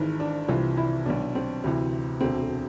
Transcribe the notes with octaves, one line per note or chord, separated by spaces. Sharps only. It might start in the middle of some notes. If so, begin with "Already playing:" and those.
Already playing: G#1 G#2 E3
D4
C2 C3 E3 F4
E4
B1 B2 D4
C4
D2 C3 E3
E1 D2 D3 C4
A3